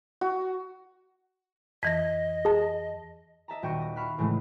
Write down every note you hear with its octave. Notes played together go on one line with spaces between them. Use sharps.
F#4
F2 E3 D#5 A#6 B6
G#4 A5
D#5 E5 A5 A#5
D#1 F#4 G5 C#6 A#6 D#7
A#6
E5 F5 B5 C#6 F6 F#6
A2 C#3 E3 G#3 A3